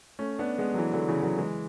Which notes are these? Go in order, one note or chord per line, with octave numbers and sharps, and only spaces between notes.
A3 C#4
B3 D4
G#3 B3
F#3
E3 G#3
D3 F#3
C#3 E3
D3 F#3
E3 G#3